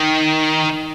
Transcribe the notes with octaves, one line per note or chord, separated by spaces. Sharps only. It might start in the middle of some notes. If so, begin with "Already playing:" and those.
Already playing: D#3